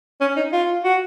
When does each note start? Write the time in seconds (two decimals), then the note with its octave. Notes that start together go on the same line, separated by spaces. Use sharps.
0.21 C#4
0.36 D#4
0.52 F4
0.84 F#4